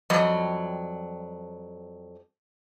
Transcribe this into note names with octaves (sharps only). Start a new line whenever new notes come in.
F2 F#3 G3 D#5